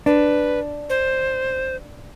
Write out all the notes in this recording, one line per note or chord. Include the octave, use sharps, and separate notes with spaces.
D4 B4
C5